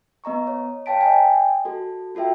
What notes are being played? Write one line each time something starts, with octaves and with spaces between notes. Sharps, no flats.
B3 D#5 A#5 C#6
C#5
C#5 F5 G5 A5 B6 D7
D#5 G5 G#5
F#4 A4
F4 F#4 A4 E5 G5